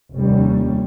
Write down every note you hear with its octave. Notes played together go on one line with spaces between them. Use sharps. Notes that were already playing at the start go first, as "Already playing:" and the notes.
F1 D#2 G3 C#4